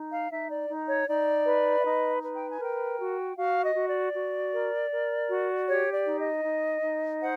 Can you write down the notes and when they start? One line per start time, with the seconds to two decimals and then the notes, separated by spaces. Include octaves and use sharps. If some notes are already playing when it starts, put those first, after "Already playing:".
Already playing: D#4
0.11 F5
0.30 D#4 E5
0.49 D5
0.68 D#4
0.88 C#5
1.07 D#4 D5
1.45 B4
1.79 E5
1.84 D#4 D#5
2.22 B4
2.35 G5
2.48 G#5
2.60 A#4 G5
2.98 F#4
3.37 F#4 F5
3.63 D#5
3.75 F#4
3.88 D5
4.14 F#4
4.52 A#4
4.91 A#4
5.29 F#4
5.67 G4 C#5
5.93 D5
6.06 D#4
6.18 D#5
6.44 D#4
6.82 D#4
7.21 C5 F#5